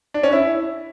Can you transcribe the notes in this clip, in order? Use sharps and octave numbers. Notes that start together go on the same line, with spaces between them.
D4
C#4
E4